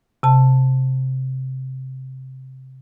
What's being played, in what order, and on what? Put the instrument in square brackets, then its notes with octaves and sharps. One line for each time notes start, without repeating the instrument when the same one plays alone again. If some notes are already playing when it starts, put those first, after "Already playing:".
[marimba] C3 A5